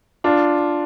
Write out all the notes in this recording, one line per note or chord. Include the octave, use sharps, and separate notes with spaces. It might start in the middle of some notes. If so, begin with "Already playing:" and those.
D4 F4